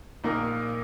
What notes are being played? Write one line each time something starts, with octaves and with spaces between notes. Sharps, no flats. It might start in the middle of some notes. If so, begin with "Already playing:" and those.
A#1 A#2 A#3 D#4 A#4